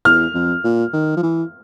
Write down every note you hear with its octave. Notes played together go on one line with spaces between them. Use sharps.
E2 F6
F2
A#2
D#3
F3
E3